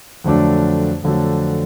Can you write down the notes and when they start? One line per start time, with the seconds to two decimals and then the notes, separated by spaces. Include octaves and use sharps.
0.24 F2 D3 F#3 A3 D4
1.02 F2 D3 F#3 A3 D4